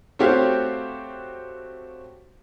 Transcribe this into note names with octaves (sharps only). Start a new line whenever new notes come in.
A3 C4 F#4 G4 C#5 F5